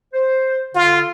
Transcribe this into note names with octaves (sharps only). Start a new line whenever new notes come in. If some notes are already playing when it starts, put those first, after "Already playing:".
C5
D3 F4